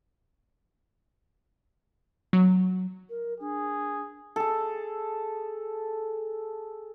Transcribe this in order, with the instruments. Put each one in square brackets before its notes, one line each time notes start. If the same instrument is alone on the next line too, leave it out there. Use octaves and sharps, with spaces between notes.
[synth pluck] F#3
[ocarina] A#4
[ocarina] D4 [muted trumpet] G#4
[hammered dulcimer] G#4 A4